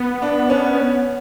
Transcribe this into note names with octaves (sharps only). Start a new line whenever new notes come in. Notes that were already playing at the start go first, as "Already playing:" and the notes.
Already playing: B3
D4
C#4